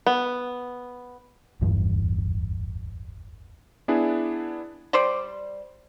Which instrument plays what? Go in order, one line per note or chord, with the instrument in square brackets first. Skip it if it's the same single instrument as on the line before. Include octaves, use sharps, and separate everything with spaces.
[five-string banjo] B3
[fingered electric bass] D1 G1 E2 G2
[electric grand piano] B3 D4 E4 G#4
[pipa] G3 C5 D5